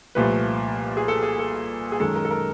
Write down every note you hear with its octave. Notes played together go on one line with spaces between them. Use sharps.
C2 A#2 F3 A3 B4
G#4
A4
G#4
A4
G#4
F#2 D#3 G#3 A4
A#4
A4
A#4